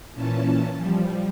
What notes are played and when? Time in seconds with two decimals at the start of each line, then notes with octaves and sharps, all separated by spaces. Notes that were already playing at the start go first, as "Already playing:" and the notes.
0.15 A#2 E3 C#4 A5
0.76 F3 G3